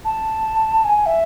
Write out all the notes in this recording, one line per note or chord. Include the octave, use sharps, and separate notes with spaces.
A5
G#5
E5